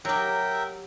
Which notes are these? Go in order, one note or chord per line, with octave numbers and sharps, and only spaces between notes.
F#3 G4 A#4 E5 G5